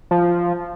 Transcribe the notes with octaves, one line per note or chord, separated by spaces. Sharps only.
F3